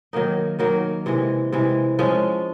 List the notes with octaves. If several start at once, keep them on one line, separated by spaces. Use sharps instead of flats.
D#3 F#3 A#3 D#4
D#3 F#3 A#3 D#4
C3 E3 G#3
C3 E3 G#3
F3 G#3 C#4